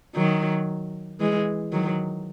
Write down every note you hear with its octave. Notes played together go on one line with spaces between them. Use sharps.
D#3 F#3
E3 G#3
D#3 F#3